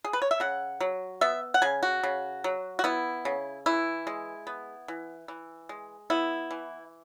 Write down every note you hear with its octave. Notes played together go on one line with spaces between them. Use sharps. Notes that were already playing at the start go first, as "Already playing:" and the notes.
G#4
B4
C#5
E5
C#3 F#5
F#3
B3 E5
F#5
C#3 G#5
F#4
C#3
F#3
F#4
B3 E4
C#3
E3 E4
G#3
B3
E3
E3
G#3
B3 E4
E3